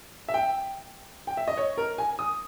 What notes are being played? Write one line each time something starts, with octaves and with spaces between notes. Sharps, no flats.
E5
G5
G5
E5
D#5
C#5
A#4
G#5
D#6